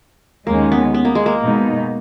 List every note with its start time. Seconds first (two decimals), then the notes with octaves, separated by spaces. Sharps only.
0.47 D#2 D#3 G#3 A#3 C#4
0.72 B3
0.94 B3
1.05 A#3
1.15 G#3
1.26 A#3
1.42 B2 G#3 D#4